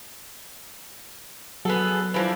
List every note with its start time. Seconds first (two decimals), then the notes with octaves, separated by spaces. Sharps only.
1.65 F#3 B3 G#4 A4
2.14 E3 F3 D4